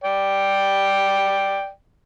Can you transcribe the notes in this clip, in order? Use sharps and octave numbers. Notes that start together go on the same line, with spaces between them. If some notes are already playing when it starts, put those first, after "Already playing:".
D5 G5